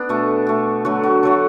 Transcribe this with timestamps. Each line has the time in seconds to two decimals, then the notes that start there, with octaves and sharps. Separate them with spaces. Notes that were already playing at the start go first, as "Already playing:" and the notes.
Already playing: B3 D4
0.09 B2 A3
0.47 B2 A3
0.85 D3 F#3 A3 F#4
1.03 F#4
1.23 D3 F#3 A3 A4